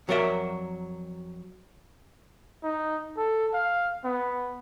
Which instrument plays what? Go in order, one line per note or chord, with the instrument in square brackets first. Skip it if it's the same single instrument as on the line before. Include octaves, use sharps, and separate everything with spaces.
[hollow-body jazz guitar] F2 F#3 F#4 A#4 D5 E5
[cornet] D#4
A4
F5
B3